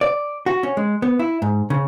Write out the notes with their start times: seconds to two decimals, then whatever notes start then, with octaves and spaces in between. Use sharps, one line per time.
0.01 D5
0.46 F#4
0.63 C#4
0.77 G#3
1.02 B3
1.19 E4
1.42 G#2
1.70 C#3